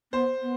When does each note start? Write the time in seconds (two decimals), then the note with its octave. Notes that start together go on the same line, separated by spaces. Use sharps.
0.12 B3 C5
0.41 B3